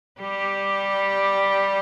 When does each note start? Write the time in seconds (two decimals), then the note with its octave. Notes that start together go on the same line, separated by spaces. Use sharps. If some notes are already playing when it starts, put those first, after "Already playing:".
0.21 G3 G4